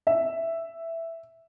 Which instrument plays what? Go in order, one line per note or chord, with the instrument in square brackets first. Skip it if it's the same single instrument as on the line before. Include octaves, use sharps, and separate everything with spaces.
[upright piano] E5